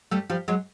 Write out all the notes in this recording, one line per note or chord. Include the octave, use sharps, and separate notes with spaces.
G3 A3
F3 G3
F#3 G#3